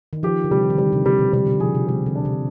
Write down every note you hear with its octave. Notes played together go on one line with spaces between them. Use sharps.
D#3
F3 G4
D3
C3 G3
D#3
D3 G3
C3
C3 G3
B2
C3 G3
D3
F3 G#4
C3
C3 G3
D3
D4
C3